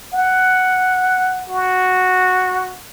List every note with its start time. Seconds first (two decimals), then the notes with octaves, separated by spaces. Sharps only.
0.14 F#5
1.49 F#4